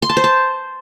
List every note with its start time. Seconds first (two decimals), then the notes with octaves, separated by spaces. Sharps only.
0.02 C6
0.09 A5
0.17 C5
0.24 A5